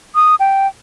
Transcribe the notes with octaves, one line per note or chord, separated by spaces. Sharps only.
D#6
G5